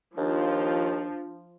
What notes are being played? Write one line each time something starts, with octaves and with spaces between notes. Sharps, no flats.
D#2 F3 D4